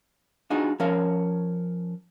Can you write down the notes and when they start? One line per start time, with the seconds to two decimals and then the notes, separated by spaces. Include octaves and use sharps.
0.50 D4 D#4 F4 F#4 G#4
0.80 F3 C#4 A#4 C#5 F5